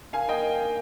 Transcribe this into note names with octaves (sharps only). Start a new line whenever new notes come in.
D#3 F5 G#5
A#3 D4 D#5 G5
D#3
A#3 D4